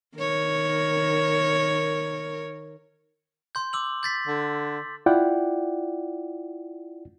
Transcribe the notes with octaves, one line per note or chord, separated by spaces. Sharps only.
D#3 A#4 C#5
C6 G6
D6 E6 F#7
G6 A6 B6
D3
E4 F4 D5 F#5 G5